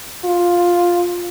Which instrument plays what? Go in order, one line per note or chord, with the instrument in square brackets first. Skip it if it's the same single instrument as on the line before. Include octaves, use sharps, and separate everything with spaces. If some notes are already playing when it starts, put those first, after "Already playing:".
[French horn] F4